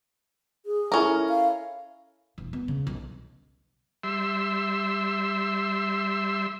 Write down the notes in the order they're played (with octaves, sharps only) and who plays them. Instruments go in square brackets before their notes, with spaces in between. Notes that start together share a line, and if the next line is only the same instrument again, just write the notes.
[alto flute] G#4
[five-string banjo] C#4 A#4 [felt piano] E4 A4
[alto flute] F5
[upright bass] E1
B3
C#3
B1
[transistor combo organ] G3 E5 C6 E6